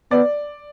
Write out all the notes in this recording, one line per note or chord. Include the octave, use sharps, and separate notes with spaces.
B3 D5